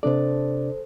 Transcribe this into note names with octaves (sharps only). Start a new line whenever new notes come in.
C3 D4 A4 C5 D5